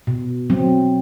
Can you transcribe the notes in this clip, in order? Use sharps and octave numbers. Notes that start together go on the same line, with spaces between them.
B2
F#3 C4